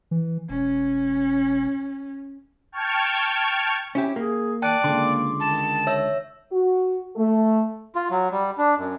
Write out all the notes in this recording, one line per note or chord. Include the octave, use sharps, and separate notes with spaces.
E3
E1 C#4
G5 A5 C#6 F6 G#6
C#4 E4 G4
A#3 G#4
D#3 D5 G5 A5 F#6
C#2 D3 A#3 C6 D6
D#3 A5
C#5 E5 E6
F#4
A3
F4
F#3
G3
D4
F#2